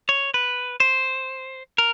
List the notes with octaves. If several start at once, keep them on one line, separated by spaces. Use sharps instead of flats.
C#5
B4
C5
A#4